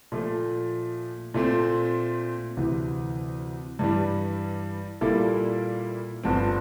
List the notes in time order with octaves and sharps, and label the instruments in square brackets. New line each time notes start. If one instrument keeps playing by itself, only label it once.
[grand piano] A#2 F3 A3
A#2 A3 C4
D2 C3 E3
G2 E3 G3
A#2 G3 A#3 E4 A4
G1 G2 F3 C4